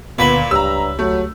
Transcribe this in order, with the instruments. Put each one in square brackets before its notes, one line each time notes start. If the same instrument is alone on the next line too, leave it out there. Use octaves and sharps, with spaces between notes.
[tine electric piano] C#2 D3 [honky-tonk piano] A#2 [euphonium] B3 [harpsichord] B4 E5 B5
[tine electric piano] C#2 G4 C#5 [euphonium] G2 [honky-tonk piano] A#5 E6
[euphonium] F#3 [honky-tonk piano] A3